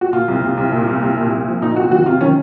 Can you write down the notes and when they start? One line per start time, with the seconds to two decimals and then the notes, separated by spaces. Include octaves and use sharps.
0.01 F#4
0.13 A#2 F4
0.28 C2
0.42 C2
0.57 C2
0.72 A#2
0.87 C2
1.02 C2
1.17 A#2
1.31 C2
1.47 F3
1.61 A#2 D#4
1.76 C2 F#4
1.91 D#3 F#4
2.06 C3 F4
2.21 D#3 C#4